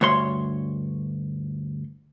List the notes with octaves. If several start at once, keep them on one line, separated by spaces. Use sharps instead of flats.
D2 G2 C#5 C6